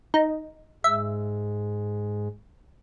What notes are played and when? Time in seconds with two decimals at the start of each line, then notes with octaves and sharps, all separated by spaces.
0.14 D#4
0.84 G#2 G#3 E5